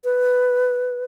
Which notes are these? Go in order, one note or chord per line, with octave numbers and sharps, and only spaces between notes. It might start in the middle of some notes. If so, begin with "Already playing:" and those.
B4